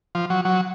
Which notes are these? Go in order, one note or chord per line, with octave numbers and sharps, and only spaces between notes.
F3
F#3
F#3